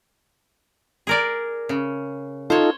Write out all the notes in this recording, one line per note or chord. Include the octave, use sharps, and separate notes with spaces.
G#4 A#4 D5
C#3
D#4 F4 A4 C5 C#5